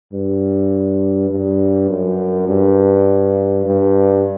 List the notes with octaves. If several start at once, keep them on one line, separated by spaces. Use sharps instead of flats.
G2
G2
F#2
G2
G2